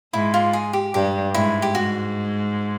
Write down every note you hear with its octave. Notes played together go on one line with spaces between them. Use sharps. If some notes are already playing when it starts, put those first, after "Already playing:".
G#2 E4
F4
G#4
G4
G2 G4
G#2 E4
G4
G#2 F#4